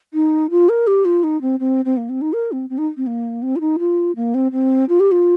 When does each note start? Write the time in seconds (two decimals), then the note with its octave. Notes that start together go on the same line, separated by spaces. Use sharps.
0.14 D#4
0.50 F4
0.69 A#4
0.87 G4
1.05 F4
1.23 D#4
1.41 C4
1.60 C4
1.85 C4
1.97 A#3
2.09 C4
2.21 D#4
2.33 A#4
2.52 C4
2.70 C4
2.78 D#4
2.97 C4
3.07 A#3
3.42 C4
3.56 F4
3.60 D#4
3.79 F4
4.16 A#3
4.34 C4
4.52 C4
4.89 F4
5.00 G4
5.11 F4